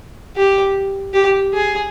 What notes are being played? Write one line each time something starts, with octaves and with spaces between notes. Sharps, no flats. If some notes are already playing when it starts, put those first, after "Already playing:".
G4
G4
G#4